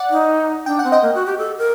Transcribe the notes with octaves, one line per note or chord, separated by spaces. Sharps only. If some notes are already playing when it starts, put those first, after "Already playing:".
Already playing: D5 F#5
D#4
D4 G5
C4 F#5
D#5 G5
A#3
F#4
G4
A4
A#4